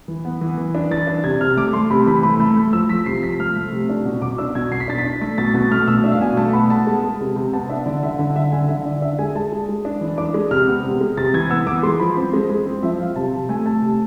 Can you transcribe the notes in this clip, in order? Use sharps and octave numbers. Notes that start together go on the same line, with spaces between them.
E3
B3
E3
E3
D4
E3 A6
D4
C3 G#6
C3 F6
A3 D6
A3 C6
C3 B5
E3 B5
A3 B5
A3 B5
A3
F3 E6
F3 B6
C3 C7
F3 B6
A3 F6
A3
C3
D4
B2
B2 D6
D4 E6
B2 G#6
B2 C7
B6
D4 A6
B6
D4
A3 B6
B2 A6
B2 A6
A3 F6
B2 E6
D4 E5
F5
B2 G#5
A3 A5
B3 B5
B3 A5
G#3
G#3
C3
C3
B3 A5
D4 E5
D3 D5
D3 E5
D3 D5
D3 E5
D3 G#5
D3 E5
D3 D5
D4 E5
G#3 G#5
G#3 A5
G#3
G#3
D4
E3
D4 D6
G#3
C3 F6
B3
C3
G#3
C3 A6
E3 G#6
B3 E6
E3 D6
G#3 C6
F3 B5
C4
G#3
G#3
C4
F3 E5
F3 F5
C3 A5
C3
A3 G#5
A3 A5
C3